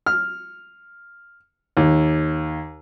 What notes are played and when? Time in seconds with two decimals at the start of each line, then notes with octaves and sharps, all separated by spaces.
0.06 F6
1.77 D#2